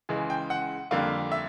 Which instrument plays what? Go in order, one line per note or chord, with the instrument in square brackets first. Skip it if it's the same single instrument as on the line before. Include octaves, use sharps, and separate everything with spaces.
[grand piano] C#2 C#3 E3 G#3
G5
F#5
F2 D3 G3 A#3 F5
E5